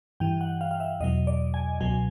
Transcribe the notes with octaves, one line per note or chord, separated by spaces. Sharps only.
G2 E3 G5
F#5
F5
F5
E5
E2 B2 F#3 D#5
D5
G#5
C#2 B2 F#3 G#5